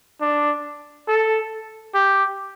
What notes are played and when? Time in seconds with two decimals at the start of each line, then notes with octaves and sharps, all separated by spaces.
0.21 D4
1.08 A4
1.94 G4